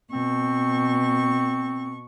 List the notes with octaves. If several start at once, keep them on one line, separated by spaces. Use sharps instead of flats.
B2 C4 C#6